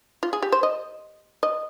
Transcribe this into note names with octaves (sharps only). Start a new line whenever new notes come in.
F4
G#4
G4
C5
D#5
D#5